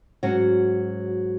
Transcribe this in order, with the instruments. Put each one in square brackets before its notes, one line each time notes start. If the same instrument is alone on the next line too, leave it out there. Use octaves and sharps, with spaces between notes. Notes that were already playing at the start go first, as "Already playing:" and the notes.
[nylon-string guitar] G#2 F#3 C#4 F#4